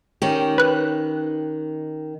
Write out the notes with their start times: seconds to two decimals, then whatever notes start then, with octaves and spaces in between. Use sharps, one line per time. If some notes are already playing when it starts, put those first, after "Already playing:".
0.22 D#3 C#4 G4
0.58 B4 F#6